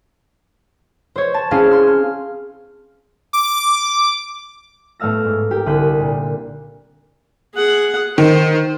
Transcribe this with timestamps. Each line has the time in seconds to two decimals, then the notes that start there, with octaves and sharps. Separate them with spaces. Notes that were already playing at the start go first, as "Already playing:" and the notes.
1.16 C5 C#5
1.34 A5
1.51 C4 C#4 E4 G#4 C5 F5
1.71 C6 F6
1.86 F6
3.33 D6
5.00 A2 A3 B3 F5 E6 A#6
5.25 G#2
5.51 G4 A#4
5.66 C2 D3 D#6 F#6 G6 B6
6.00 A#2
7.55 G#4 F#5
8.18 D#3 C5